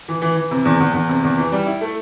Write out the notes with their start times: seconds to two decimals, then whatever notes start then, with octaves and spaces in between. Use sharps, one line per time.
0.08 E3
0.22 E3
0.37 E3
0.51 C3
0.65 E2
0.80 E2
0.94 E2
1.09 C3
1.23 E2
1.38 E3
1.52 G3
1.67 E4
1.81 A3